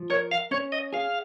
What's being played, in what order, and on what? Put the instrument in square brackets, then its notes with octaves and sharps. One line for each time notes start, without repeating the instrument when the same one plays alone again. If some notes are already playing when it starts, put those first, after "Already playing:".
Already playing: [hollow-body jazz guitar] F3
[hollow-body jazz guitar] A#4 [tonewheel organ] C#5
[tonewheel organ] F5
[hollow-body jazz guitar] C#4 [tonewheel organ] C#5
[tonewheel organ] D#5
[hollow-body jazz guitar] G#4 [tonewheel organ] F5